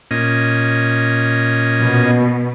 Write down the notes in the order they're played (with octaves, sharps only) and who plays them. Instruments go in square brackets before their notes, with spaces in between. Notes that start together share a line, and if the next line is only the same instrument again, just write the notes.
[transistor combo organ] A#2 C#4 D#5
[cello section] B2